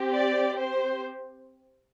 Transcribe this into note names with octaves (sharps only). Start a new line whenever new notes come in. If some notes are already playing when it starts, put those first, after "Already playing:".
Already playing: C4 G4
D5
C5